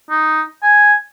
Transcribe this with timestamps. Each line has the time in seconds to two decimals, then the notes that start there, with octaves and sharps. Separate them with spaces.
0.10 D#4
0.63 G#5